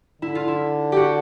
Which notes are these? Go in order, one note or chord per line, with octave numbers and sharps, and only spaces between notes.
D3 E4
F4
E4
F#4 G4